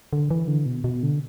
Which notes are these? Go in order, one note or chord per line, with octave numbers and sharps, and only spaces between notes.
D3
E3
D3
B2
B2
D3